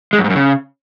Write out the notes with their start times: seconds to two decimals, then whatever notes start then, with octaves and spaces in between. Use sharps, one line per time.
0.13 G#3
0.19 F#2
0.24 G#2
0.30 F#2
0.35 C#3